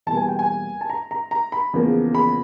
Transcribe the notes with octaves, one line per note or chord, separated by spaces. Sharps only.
E2 B2 G3 A#3 A5
G#5
G5
G#5
A5
A#5
A#5
A#5
B5
E2 C#3 F3 A#3
B5